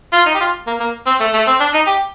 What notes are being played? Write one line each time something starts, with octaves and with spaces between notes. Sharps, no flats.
F4
D#4
G4
F4
A#3
A#3
C4
A3
A3
C4
D4
D#4
G4